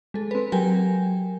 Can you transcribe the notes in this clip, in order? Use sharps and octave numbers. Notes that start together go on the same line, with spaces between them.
G#3 A4
C4 B4
F#3 G4 A#4 G5 G#5